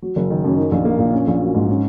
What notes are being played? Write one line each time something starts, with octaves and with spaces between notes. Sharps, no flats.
F#3
F#1
D#3
F#2
D#4
A#1
A#3
A#2
C#4
A#1
F#3
G#2
C#4